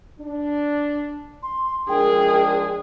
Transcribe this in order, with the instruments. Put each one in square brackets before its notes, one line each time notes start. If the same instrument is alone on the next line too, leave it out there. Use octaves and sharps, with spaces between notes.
[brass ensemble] D4
[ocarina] C6
[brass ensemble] F3 G#3 D4 [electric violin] G#4 [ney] A#4 [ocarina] G5